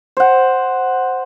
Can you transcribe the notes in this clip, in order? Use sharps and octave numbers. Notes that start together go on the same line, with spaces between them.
C5 F#5